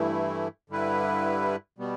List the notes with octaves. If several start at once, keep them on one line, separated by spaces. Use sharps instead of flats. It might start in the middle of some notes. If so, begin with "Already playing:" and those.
Already playing: G2 E3 A3 E4
G2 D3 G3 E4 B4
B2 G3 B3